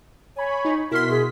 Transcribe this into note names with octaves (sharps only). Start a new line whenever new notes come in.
C#5 G#5 B5 C#6
D#4
B2 E4 F#4 A#4 C6 B6
G#4